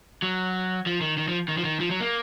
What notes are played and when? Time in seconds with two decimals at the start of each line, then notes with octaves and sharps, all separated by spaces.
0.22 F#3
0.86 F3
1.01 D#3
1.17 D#3
1.28 F3
1.48 D#3
1.58 F3
1.64 D#3
1.80 F3
1.90 F#3
2.00 A#3